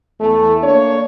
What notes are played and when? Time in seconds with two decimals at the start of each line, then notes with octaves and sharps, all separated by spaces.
0.20 E2 A3
0.62 A#3 D4 C#5